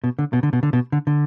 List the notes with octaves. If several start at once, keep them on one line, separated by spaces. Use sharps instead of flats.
B2
D3
B2
D3
B2
D3
B2
D3
D3